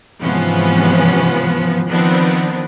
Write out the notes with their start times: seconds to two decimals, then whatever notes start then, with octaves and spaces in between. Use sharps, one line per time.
0.22 G#2 C3 E3 F3 B3 C#4
1.88 D#3 F3 B3 C4 D4